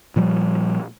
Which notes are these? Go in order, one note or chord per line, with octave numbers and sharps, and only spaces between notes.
A#2 F3 G3